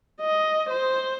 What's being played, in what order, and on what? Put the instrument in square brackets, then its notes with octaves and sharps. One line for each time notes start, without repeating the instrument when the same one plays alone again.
[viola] D#5
C5